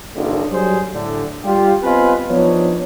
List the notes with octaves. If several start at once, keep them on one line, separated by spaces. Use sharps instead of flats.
F#1 B1 D3
F#3 G3 G#4 C5
A2 D3
G3 F4 G4
B3 C4 F4 B4 D#5 G#5
F3 B3 D4 D#4 C#5